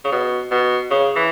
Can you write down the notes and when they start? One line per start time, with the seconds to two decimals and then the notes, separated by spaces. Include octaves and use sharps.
0.04 C#3
0.12 B2
0.51 B2
0.90 C#3
1.16 E3